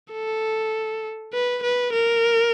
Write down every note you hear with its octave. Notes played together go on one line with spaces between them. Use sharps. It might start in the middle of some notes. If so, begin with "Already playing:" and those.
A4
B4
B4
A#4